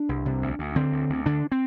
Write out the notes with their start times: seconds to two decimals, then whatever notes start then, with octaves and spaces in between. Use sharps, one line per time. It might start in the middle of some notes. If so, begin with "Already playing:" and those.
Already playing: D4
0.09 C2
0.26 C3
0.42 D2
0.59 D2
0.76 D3 C4
0.92 D2
1.10 D2
1.26 D3 D4
1.52 C4